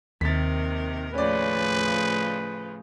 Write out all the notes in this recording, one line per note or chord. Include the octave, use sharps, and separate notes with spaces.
D#2 C3 D#3 A#4 A6 B6
A2 C#3 F3 C#4 B4 D5